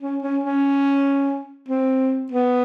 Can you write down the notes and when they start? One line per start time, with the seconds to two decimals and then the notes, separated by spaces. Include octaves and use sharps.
0.02 C#4
0.23 C#4
0.44 C#4
1.68 C4
2.32 B3